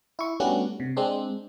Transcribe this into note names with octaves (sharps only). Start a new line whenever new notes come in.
E4 C#6
G3 A3 B3 C#4 D4 F#4
C3
G#3 C4 D4